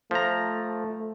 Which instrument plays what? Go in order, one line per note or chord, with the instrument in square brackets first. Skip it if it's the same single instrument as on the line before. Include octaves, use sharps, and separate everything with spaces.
[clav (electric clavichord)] F3 A#5 [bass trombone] A3